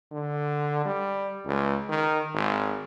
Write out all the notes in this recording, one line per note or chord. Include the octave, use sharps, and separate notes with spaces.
D3
G3
C#2
D#3
G#1